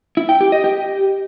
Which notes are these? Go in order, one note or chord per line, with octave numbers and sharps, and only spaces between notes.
E4
G5
G4
D#5
G4